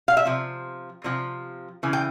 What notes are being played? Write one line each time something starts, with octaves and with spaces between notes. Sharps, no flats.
F5
E5
C3 F3
C3 F3
C#3 E3
G5